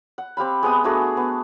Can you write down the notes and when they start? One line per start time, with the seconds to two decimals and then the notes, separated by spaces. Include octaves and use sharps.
0.18 F#5
0.37 C4 G4 F5 B5
0.63 G#3 B3 D#6
0.84 A3 D4 F#4 G#4
1.17 B3